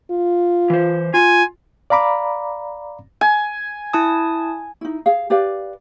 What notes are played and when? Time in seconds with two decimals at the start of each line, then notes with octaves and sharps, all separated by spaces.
0.11 F4
0.70 E3 C5
1.14 F4 G#5
1.90 D5 F5 A#5 B5 D6
3.21 G#5
3.93 E4 A5 D#6
4.81 D#4 E4
5.06 G#4 F5
5.30 G4 B4 D5 F5